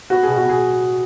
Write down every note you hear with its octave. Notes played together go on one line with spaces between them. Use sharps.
B3 F#4 B4
G#4
B2
F#4
B2 G#4